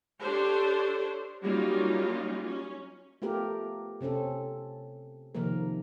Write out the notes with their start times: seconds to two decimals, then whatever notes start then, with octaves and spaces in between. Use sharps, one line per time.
0.20 D4 G4 A4 C5 C#5
1.44 F#3 G3 A#3 C#4 D#4 F4
2.47 C#4
3.22 A3 B3 F4 G4 A#4
4.01 C3 C4 C#4 A4
5.35 C3 D#3 F3 A#3 A#4